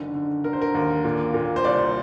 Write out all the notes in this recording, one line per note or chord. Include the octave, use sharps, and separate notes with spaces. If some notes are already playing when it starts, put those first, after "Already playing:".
Already playing: F#1 D3 D#3
D3
D3 A#4
C5
A#4
D#2
A#2
A#2
C5
C2 D5